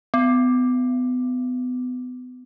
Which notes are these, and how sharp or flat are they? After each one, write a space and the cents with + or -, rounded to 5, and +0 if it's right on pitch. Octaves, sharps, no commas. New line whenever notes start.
B3 +30